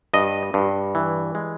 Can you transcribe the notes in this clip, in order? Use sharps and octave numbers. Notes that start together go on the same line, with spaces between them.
G2 D#5
G2
E3
G#3